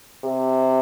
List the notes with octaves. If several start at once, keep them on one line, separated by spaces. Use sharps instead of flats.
C3